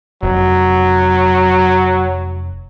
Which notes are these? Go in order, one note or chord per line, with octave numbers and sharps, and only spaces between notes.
F1 F#3